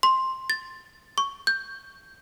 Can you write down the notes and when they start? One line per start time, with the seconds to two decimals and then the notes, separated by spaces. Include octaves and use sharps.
0.03 C6
0.50 A6
1.18 C#6
1.47 G6